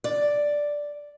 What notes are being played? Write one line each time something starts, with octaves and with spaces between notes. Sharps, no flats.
D5